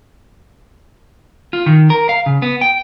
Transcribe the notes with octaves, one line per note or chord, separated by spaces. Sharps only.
F4
D#3
A#4
F5
C#3
B3
G5